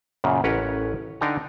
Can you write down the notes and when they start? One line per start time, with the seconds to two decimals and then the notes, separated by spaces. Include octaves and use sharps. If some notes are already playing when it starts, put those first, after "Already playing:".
0.24 F#2 A#2 C#3
0.44 A1 C#4 A#4 B4 C#5 F#5
1.21 D3 D4 D#4 G5 G#5 A#5